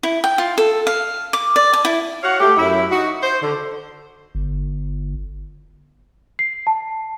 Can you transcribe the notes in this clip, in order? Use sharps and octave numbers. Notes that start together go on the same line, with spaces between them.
E4
G5
F4
A4
F5
D6
D5
A5
E4
F#4 C#5 F5 F#5
A3 G4
F#2 E4
D#4 F#4
C5
D3
G1
C7
A5